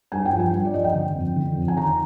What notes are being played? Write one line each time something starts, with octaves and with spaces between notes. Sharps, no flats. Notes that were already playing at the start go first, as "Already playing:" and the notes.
G2 G#5
G5
F3
G#5
G2
D5
F3 D#5
G5
D3
F2
D3
F2
G#5
D#3 A#5